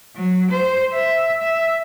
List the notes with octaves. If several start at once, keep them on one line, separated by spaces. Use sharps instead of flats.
F#3
C5
E5
E5